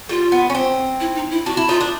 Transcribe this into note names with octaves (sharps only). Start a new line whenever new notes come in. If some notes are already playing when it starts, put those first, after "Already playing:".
G3 F4
B3
C#4
C4
E4
D#4
E4
D4 F#4
E4
D#4 F4
D4